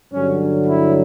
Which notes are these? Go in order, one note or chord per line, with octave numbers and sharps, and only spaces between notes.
G2 D3 F#3 C#4
E4